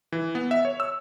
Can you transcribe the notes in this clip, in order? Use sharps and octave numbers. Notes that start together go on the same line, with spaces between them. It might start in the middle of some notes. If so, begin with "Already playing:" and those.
E3
B3
E5
C#5
E6